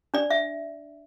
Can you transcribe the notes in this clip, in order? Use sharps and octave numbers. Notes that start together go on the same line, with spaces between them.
D4 D5
E5